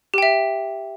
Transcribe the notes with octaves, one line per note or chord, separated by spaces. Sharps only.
G4 E5 G5